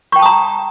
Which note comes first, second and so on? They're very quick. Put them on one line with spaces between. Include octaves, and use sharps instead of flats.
C#6 G5 A5 D#6 A#5